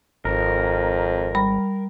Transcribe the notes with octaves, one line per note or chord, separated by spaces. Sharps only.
G#1 F2 A#4
G3 B5